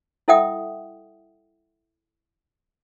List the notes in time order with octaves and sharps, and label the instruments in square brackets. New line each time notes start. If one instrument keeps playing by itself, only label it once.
[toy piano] E4 A4 E5 F#5 G5 D#6